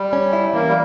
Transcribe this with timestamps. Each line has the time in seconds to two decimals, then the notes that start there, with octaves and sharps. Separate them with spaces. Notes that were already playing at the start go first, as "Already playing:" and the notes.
Already playing: G3
0.13 C#4
0.33 E4
0.53 E3 A#3
0.69 G3